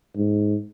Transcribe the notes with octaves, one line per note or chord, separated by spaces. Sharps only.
G#2